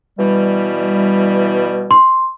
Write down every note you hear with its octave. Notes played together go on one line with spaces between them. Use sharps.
B2 E3 G3
C6